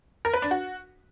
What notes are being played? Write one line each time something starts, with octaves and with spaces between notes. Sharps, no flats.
A#4
B4
D4
F#4